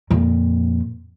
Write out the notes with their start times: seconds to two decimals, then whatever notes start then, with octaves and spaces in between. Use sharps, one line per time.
0.11 F2 A#2